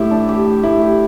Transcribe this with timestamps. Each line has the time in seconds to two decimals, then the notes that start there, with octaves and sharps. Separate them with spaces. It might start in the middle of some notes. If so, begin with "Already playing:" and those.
Already playing: A2 E4 G4
0.11 D4
0.29 G4
0.46 A2
0.63 A2 E4
0.82 G4